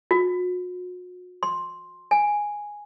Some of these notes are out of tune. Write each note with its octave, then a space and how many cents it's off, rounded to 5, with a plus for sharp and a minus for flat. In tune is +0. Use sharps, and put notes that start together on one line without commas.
F#4 -40
C6 +5
G#5 -5